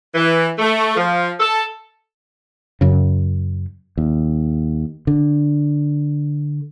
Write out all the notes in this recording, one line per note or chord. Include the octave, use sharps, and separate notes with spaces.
E3
A3
F3
A4
F#2 C#3
D#2
D3